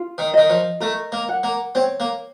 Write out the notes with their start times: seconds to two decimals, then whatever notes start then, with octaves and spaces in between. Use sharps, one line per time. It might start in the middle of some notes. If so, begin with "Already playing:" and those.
Already playing: F4
0.18 D#3
0.34 D#3 D#5
0.50 F3
0.80 A3 A#4
1.12 A#3
1.29 F#5
1.43 A#3
1.75 C4 C#5
2.00 A#3